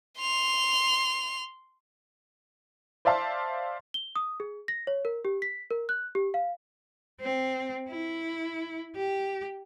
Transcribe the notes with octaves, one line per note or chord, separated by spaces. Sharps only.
C6 F7
C5 D5 E5 F5 A5 C6
G7
D#6
G#4
A#6
C#5
A#4
G4
B6
A#4
F#6
G4
F5
C4
E4
G4